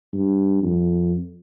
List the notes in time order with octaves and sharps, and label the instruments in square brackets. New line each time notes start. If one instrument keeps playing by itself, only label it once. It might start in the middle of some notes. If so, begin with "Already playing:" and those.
[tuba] G2
F2